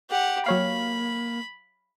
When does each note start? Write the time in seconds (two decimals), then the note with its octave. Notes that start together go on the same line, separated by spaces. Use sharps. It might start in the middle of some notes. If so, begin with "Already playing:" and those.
0.10 G4 F#5
0.46 F#3 A#3 C#5 F5 B5